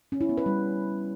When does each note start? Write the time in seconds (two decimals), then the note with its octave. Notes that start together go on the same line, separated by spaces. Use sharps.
0.12 C#4
0.21 E4
0.29 B3
0.38 B4
0.46 G3